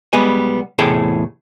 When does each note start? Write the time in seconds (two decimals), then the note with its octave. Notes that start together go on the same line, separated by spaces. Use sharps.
0.13 B1 G3 G#3 B3 G#5
0.78 E2 A2 C3 G#4 A4 G5